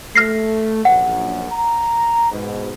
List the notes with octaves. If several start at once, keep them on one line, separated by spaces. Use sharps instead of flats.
A3 F6 A#6 C7
A#1 F#2 F#5
A#5
G#2 B2